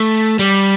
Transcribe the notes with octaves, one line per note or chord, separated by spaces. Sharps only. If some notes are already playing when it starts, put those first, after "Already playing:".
Already playing: A3
G3